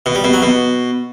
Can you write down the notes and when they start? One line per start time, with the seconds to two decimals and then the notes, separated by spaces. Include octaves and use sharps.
0.06 B2
0.15 G3
0.24 B2
0.33 F#3
0.42 B2